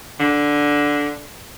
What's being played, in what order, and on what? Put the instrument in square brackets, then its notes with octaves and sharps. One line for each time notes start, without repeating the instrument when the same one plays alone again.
[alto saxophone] D3